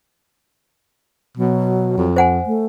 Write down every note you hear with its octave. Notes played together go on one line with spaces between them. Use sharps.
B2 F#3
F2
C5 F#5 G#5
A3